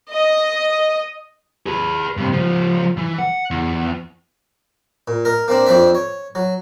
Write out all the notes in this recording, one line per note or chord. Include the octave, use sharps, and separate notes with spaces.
D#5
G#4 B4
G2 C3
C#2 F3
E3
F#5
E2
A#2
A#4 D#5
A#3 C4 D4
F2 F3 C4 D4 E5
C#5
F#3